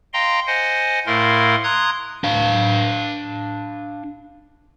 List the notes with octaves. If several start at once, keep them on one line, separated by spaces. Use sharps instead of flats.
D#5 F5 G5 A#5 C6
C5 D#5 F#5 G#5
A2 A3 E4 A#4 F5 C6
A#5 C6 D#6 F#6 G#6
D4 F5